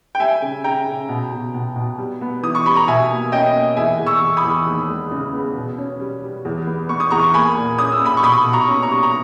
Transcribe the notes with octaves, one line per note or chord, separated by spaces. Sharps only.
G5
G3 E5 G#5
C#3
C#3 G5 A#5
C#3
B2
B2
B2
B2
G3
B3
E3 D#6
C#6
G3 B5
A#5
B2 E5 G#5
A#3
C#4 D#5 G5
A#3
E2 E5 G#5
E2
C#6 E6
E2
B5 D#6
E2
D#2
G#3
C#3
B3
B2
C#4
G3
G3
E2
B3
B3 C#6
D#6
E2 A#5 C#6
C#6
A#3 G#5 B5
A#2
C#4 D#6
E6
A#2 B5 D#6
C#6
B2 B5 D#6
B2
A#5 C#6
C#4
A#5 C#6
G3
A#5